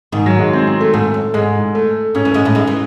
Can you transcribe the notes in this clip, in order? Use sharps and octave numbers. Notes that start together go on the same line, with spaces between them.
G#2 D#3
F#3
G#3
C4
C4
A3
G#2 A3
F#2
G#2 G#3
A3
G#2 C#4
E2 E3
G#2 G#3
A2 A3
G#2 G#3
E3